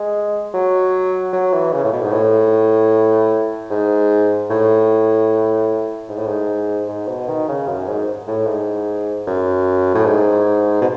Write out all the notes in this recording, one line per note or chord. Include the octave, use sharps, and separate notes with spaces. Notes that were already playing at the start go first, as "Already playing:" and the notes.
Already playing: G#3
F#3
F#3
E3
C#3
A2
B2
G#2
A2
G#2
A2
G#2
A2
G#2
G#2
B2
D#3
C#3
F#2
G#2
A2
G#2
F#2
A2
G#2
B2